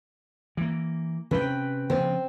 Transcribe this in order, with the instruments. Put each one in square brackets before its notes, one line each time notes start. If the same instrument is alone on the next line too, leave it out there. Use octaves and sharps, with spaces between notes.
[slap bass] E3 A#3
[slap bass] C3 C4 C#4 [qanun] B4 G5
[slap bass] C#3 F3 B3 [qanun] C4